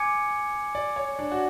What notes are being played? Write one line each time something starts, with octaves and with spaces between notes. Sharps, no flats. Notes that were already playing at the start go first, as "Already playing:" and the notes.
Already playing: G#5 D6 G#6 C#7
D5
C#5
D4
F#4